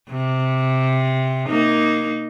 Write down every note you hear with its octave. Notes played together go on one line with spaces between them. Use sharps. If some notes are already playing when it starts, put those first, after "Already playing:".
C3
A#3 D#4